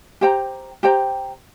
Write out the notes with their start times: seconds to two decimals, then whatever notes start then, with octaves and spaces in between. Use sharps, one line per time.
0.21 G4 C5 G5 A#5
0.83 G4 C5 G5 A#5